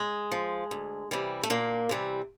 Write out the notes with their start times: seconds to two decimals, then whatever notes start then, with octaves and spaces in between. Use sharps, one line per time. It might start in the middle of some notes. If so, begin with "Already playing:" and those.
Already playing: G#3
0.32 F3
0.71 D2
1.11 C3 E3 G3
1.43 A3
1.50 D2 A#2 A#3
1.89 C3 E3 G3